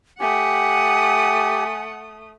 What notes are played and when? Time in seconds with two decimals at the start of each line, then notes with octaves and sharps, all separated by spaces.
0.20 A3 G4 F#5 G#5 D#6